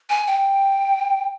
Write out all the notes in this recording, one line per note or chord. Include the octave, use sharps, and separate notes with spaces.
G#5
G5